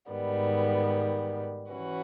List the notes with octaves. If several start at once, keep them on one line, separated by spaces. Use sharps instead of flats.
G#2 D#3 G3 B3
E3 C#4 F#4 B4